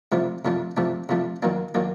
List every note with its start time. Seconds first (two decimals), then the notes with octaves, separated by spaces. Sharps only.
0.12 C3 F3 A3 D4
0.45 C3 F3 A3 D4
0.77 C3 F3 A3 D4
1.09 C3 F3 A3 D4
1.42 D#3 F#3 A#3 D4
1.75 D#3 F#3 A#3 D4